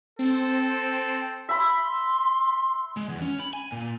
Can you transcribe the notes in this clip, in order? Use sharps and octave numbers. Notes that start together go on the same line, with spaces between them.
C4 A4
E5 B5 C6
G#3
E2
C#4
B5
G#5
A#2